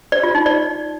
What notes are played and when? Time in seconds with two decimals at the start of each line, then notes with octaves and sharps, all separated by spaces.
0.12 D5
0.23 F4
0.35 D#4
0.46 D5